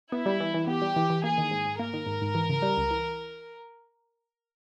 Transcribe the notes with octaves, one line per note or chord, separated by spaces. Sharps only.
B3 E4
G3
E3
E3
B3 G4
G3
E3
E3
A#3 G#4
D#3
G#2
G#2
A#3 A#4
D#3
G#2
G#2
E3
C#3
G3
C#2
E3